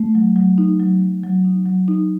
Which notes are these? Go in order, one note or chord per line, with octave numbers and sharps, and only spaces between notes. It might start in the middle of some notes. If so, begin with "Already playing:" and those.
Already playing: A3
F#3
F#3
D#4
F#3
F#3
F#3
D#4
F#3
D#4